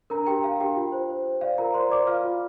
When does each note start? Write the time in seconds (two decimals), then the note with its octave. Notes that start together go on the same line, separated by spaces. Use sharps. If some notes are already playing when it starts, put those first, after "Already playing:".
0.10 D4 A#4 A#5
0.27 D4 G4 G5
0.43 A#4 F5
0.60 D4 G4 G5
0.76 F4
0.92 C5
1.10 C5
1.26 C5
1.41 D5 F5
1.58 F4 A#4 A#5
1.74 C5 D5 C6
1.90 D5 D6
2.07 F4 F5 F6
2.24 F4